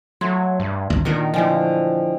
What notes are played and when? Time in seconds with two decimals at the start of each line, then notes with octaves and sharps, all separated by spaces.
0.21 F#3 A3 C6 G#6
0.60 G2
0.90 G#1 D2
1.05 A#2 D#3 D4 F#4 A#4
1.34 D3 E3 F3 A3 D#5 G5 G#5